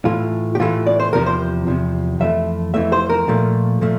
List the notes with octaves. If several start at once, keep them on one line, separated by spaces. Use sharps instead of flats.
A2 E3 A3 F4
G4
A2 E3 A3 F4
D5
C5
E2 C3 F3 A#4
C5
E2 C3 F3
F2 E3 A3 E5
F2 E3 A3 E5
C5
A#4
A#2 F3 A3
A#2 F3 A3